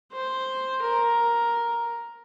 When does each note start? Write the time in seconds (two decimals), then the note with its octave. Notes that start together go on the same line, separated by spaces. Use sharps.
0.13 C5
0.82 A#4